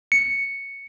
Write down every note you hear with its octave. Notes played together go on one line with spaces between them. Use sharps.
C#7